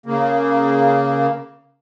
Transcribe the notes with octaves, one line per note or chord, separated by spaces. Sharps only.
C#3 A#3